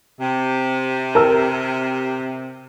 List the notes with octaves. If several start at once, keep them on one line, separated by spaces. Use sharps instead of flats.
C3
A#4 A5 E6